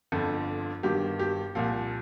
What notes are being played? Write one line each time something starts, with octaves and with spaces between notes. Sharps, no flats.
G1 F2 D3 F3
G1 G2 D#3 G4
G4
C2 A#2 F3 F5